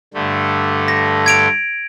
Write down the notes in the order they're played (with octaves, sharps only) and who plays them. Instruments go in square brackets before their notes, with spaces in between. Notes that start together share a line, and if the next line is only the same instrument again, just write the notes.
[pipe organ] G2 D3 A3
[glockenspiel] A#6
G#6 D7 F7